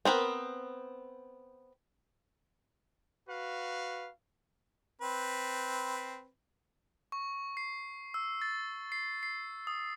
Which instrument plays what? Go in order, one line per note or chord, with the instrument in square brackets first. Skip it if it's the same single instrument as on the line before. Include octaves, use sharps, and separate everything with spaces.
[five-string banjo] B3 C4 A#4 B4
[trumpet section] F#4 B4 F5
[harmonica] C4 B4
[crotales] C#6
C7
E6
A6
C7
C7
D#6